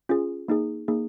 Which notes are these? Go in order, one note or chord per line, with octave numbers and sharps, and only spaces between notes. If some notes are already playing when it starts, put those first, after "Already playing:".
C#4 F4 G#4
A#3 D#4 G#4
A#3 D#4 G#4